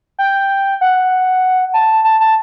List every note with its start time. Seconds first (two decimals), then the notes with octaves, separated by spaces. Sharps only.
0.19 G5
0.81 F#5
1.74 A5
2.04 A5
2.20 A5